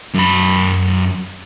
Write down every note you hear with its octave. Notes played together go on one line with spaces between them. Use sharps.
F#2 B5